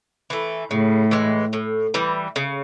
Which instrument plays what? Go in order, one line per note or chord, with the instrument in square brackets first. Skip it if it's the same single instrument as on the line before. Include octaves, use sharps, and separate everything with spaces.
[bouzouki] E3 A3
[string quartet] A2 [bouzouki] C#3
[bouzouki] E3 G#3
A2
E3 G3
C#3